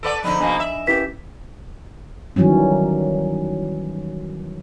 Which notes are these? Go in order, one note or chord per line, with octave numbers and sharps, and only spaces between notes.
A4 B4 D5 F#5 C#6 D7
G#2 D3 F3 D#4 B5
G#2 B2 A#3 D4 D#5 G#5
E5
C#4 E4 G4 B4 B6
D#3 E3 F#3 G3 C#4